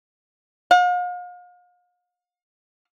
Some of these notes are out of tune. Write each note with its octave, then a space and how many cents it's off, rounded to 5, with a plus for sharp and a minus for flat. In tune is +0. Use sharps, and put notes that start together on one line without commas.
F5 +40